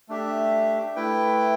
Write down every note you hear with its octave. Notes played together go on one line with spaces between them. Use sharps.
A3 D4 G4 E5
A3 E4 B4 G5